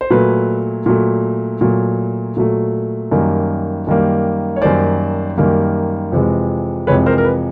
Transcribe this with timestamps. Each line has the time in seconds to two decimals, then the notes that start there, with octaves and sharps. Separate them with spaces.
0.01 C5
0.10 A#2 F#3 A3 B4
0.86 A#2 F#3 A3
1.61 A#2 F#3 A3
2.37 A#2 F#3 A3
3.11 F#2 D#3 G3 A#3
3.87 F#2 D#3 G3 A#3
4.56 C#5
4.62 F#2 D#3 G3 A#3 C5 D5
5.38 F#2 D#3 G3 A#3
6.12 F2 C3 E3 G#3
6.87 F2 C3 E3 G#3 B4 C#5
7.06 A#4 C5
7.18 A#4
7.24 B4